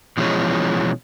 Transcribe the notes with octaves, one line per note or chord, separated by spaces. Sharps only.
B2 E3 F3 G#3 A3 C#4